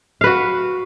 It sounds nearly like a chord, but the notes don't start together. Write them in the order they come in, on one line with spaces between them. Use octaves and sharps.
F5 B4 F#4